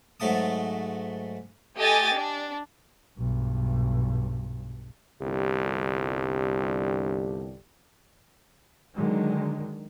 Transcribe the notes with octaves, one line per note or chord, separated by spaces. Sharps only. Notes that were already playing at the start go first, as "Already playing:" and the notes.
G#2 F#3 A3 A5 D#6
A3 G4 D#5 G#5 A6
D4
B1 G2
G1 C2 D4 G4
D3 D#3 F#3 G#3